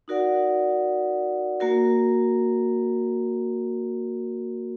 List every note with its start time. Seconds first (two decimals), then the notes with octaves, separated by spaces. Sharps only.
0.08 D#4 F#4 A#4 D5 F#5
1.60 A#3 F#4 A#4